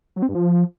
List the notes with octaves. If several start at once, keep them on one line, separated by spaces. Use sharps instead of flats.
F#3
C4
G2
F3